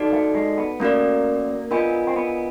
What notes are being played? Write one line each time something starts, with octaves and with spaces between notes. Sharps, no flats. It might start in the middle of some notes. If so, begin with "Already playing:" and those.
Already playing: D#4 F#4 A4 D5
A3
G#3
B3
A3 A#3 C#4 F#4 A#4 D5
B3 D4 F4 A#4 D#5 G#5
C4
B3